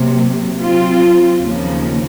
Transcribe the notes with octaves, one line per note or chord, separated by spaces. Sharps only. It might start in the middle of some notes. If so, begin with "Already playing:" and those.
Already playing: C3 F#3 A#3
F#3 C4 F4
D#2 C#3 F3 A#3